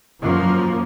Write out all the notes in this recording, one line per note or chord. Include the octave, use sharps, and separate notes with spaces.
F#2 F3 A#3